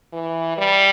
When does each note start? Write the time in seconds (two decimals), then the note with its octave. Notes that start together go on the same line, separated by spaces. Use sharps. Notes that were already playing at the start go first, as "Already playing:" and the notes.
0.13 E3
0.58 G3